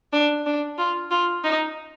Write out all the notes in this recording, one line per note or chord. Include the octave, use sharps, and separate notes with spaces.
D4
D4
F4
F4
D#4